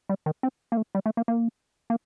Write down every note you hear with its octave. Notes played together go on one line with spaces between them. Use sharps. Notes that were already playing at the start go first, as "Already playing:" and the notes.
G3
D#3
C4
A#3
A3
G3
A3
A#3
A#3
A#3